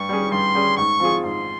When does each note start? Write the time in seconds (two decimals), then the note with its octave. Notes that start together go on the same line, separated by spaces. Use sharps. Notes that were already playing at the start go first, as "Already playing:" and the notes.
Already playing: G2 C#6
0.09 G3 C#4 G#4
0.31 G2 C6
0.55 G3 C#4 G#4
0.77 G#2 C#6
1.00 F3 C4 F4 G#4
1.23 G#2 C6